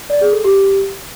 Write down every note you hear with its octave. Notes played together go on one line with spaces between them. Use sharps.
D5
G#4
A4
G4